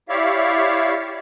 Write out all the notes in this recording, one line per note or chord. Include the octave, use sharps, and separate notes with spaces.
E4 G4 C#5 D5 E5 F5